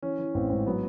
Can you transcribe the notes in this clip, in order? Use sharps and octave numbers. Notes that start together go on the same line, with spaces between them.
E3 C#4
E3
A1 C4
G#2 C4
F#3 B3